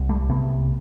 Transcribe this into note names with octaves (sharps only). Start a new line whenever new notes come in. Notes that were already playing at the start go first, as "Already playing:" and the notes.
Already playing: C2
G3 A3
C2 C3 A3 B3